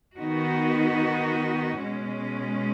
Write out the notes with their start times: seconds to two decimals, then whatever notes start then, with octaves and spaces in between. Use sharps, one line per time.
0.17 D#3 B3 D#4 F#4
1.78 B2 G#3 C#4